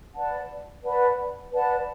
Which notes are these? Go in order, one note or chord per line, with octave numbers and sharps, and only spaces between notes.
B4 D5 F#5 A5
B4 D5 F#5 A5
B4 D5 F#5 A5